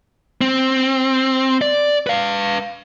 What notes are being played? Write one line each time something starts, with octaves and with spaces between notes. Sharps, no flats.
C4
D5
B4 F5